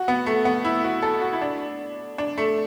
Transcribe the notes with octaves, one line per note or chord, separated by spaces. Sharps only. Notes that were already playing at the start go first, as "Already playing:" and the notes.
Already playing: F#4
B3
A3
B3
E4
F#4
A4
F#4
E4
D4
D4
A3